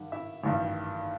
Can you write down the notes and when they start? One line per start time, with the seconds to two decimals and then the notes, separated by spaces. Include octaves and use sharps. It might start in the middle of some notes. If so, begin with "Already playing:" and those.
Already playing: G2 D#3 G3 F#5
0.12 E4 E5
0.44 A1 G2 D#3 G3